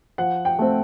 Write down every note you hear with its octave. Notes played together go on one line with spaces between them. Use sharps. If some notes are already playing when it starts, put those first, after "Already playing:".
F3 F#5
G5
A3 C4